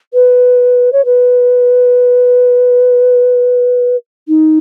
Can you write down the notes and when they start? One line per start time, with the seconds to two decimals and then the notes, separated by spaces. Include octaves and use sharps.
0.14 B4
0.93 C#5
1.05 B4
4.28 D#4